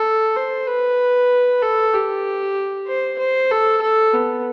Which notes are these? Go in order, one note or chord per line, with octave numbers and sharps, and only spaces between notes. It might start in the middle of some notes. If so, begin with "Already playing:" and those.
Already playing: A4
C5
B4
A4
G4
C5
C5
A4
A4
B3